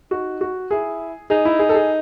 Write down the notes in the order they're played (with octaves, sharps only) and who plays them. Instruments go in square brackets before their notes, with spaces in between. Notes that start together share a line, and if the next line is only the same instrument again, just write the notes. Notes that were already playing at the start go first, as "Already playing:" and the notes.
[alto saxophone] D#4 [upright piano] F#4
[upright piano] F#4
[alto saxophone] E4 [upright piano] G#4
[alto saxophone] D#4 [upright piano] G#4
[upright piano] E4
G#4
A4
G#4